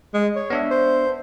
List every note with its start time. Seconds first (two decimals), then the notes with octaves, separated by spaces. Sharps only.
0.14 G#3
0.35 C#5
0.50 B3 D4 E5
0.70 C5